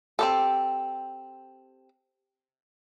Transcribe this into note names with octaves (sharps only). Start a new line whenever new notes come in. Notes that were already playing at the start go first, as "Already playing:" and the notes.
C4 G4 A4